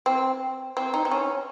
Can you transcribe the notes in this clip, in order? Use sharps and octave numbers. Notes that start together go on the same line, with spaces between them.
C4
C4
D#4
C4
C#4